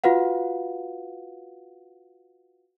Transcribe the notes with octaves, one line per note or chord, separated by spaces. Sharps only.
F4 F#4 B4 F5 F#5